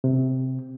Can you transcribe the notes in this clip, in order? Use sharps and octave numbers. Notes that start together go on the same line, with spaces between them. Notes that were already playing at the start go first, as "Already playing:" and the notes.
C3